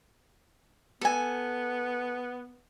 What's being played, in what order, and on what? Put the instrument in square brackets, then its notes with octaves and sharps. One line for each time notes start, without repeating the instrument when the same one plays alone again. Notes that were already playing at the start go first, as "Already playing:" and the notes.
[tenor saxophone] B3 [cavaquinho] A4 G#5